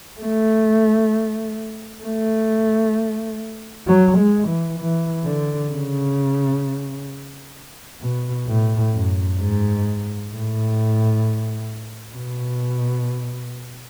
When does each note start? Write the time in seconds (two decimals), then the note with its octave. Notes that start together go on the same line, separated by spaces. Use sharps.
0.20 A3
2.03 A3
3.87 F#3
4.18 G#3
4.48 E3
4.80 E3
5.25 D3
5.71 C#3
8.01 B2
8.47 A2
8.93 F#2
9.39 G#2
10.31 A2
12.15 B2